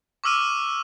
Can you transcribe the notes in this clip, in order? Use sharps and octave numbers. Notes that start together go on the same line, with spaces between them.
C#6 D6 E6 F6 D#7